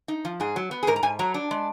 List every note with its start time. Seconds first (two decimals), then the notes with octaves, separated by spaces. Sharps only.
0.08 D#4
0.25 F3
0.40 G#2 G#4
0.56 F#3
0.71 B3
0.83 G#4
0.87 G#2 A#4
0.96 A#5
1.03 G#2 G#5
1.19 F#3 A#5
1.34 D4
1.51 G#3